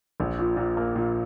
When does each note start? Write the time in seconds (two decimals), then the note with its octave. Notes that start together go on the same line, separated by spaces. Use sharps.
0.20 A#1
0.39 A#2
0.57 A#2
0.77 A#3
0.96 A#2